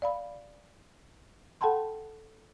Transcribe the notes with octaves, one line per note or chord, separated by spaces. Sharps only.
D5 F5 B5
A4 F#5 G5 A5 B5 C6